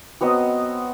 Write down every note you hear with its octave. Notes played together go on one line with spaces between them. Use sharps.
F#3 B3 C4 D#5